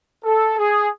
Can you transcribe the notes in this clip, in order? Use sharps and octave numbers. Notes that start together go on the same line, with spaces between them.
A4
G#4